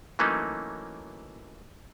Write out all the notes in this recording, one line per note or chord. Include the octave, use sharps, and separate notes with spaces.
E3 F#3 A3 A#3 C#4 D#4